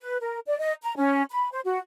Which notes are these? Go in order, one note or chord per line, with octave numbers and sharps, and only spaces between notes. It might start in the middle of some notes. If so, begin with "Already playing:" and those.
B4
A#4
D5
D#5
A#5
C#4
B5
C5
F#4